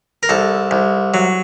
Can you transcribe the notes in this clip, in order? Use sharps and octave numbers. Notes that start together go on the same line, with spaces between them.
A#4
C2 A4
C2
F#3